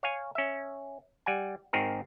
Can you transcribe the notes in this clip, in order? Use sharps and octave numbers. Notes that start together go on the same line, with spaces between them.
C#5 F5 G#5
C#4 E5
G3 F#5 G#5
G#1 D#3 C4 G#4 A#4